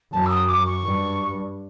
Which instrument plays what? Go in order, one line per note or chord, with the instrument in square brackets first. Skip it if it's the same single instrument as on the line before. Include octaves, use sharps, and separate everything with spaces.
[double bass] F#2 [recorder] A5
[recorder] E6
D#6
D6
C#6
[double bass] G2